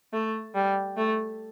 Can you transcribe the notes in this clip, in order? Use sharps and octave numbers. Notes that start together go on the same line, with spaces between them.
A3
G3
A3